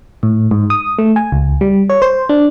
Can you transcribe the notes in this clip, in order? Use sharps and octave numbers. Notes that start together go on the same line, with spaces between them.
A2
G#2
D#6
A3
G#5
C#2
G3
C#5
C5
D4